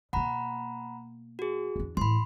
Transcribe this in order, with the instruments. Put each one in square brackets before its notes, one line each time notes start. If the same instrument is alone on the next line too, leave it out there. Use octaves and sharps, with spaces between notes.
[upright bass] B2 A#3 [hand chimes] F#5 A#5 B5
[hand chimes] F#4 G#4
[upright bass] E2 D4
[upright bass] A2 E3 [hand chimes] B5 C6